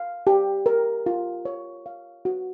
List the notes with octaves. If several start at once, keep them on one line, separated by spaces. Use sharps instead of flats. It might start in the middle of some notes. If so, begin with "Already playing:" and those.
Already playing: F5
G4
A#4
F4
C#5
F5
F#4